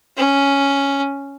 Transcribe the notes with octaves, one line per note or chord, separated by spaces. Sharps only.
C#4